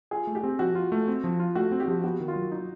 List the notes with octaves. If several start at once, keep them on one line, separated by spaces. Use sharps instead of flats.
F4 G#4
A3
G4
C4
F3 F#4
F4
A3
C4
F3
F4
A3 F#4
C4
G4
F3
B3 F#4
D#3
F4
F#3
D#4